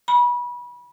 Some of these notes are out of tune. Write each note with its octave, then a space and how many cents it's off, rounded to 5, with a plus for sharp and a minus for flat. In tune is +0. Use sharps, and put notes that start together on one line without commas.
B5 -25